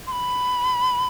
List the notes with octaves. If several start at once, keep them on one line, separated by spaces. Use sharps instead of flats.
C6
B5